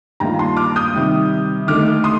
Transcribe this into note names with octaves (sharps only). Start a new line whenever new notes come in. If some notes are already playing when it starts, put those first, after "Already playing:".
G2 D#3 A#3 F4 G5 A#5
A5 C6
D6 F6
D#6 G6
C3 D#3 G3
D#2 D3 A3 D#4 D6 F6
C6 D#6